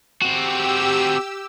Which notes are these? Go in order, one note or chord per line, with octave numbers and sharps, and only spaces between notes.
C4 F#4 G4 E6